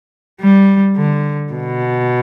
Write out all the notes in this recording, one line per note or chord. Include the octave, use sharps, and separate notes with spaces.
G3
D3
B2